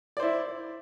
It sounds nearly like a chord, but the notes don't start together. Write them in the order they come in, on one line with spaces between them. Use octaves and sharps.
D5 C5 E4